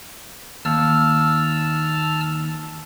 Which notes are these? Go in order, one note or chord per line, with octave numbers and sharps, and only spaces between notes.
D#2 A5 E6 F6